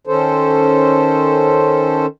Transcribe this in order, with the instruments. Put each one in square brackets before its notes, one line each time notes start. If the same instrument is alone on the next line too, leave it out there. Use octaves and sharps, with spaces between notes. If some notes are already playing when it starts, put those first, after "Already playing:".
[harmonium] D#3 C#4 A4 C5